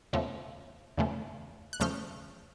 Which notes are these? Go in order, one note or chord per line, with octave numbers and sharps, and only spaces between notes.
E2 C#3 F3 A3
E2 C#3 F3 A3
F#6
E2 C#3 F3 A3 F6 G6